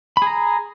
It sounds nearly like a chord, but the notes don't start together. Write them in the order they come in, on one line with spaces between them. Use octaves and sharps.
B5 G#4 A#5